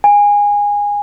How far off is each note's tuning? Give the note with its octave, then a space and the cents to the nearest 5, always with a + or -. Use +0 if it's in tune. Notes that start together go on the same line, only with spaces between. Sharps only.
G#5 -20